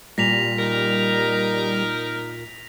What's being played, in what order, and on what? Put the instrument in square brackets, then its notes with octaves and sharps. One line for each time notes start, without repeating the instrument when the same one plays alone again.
[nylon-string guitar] A#2 [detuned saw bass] G3 [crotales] A#6 B6 F7
[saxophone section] D#4 A#4